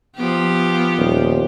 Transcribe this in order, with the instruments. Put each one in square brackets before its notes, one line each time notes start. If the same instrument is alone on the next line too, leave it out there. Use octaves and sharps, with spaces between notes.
[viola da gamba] F3 B3 G4
[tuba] D#1